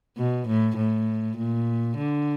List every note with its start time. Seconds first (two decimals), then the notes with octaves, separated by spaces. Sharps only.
0.17 B2
0.47 A2
0.77 A2
1.38 A#2
1.97 D3